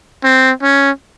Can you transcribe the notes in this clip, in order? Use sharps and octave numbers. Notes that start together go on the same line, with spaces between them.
C4
C#4